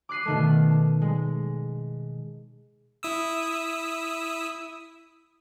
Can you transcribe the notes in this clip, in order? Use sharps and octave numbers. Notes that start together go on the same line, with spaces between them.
D6 F#6 C7 D#7
B2 D#3 A3
G#3
E4 D#6 E6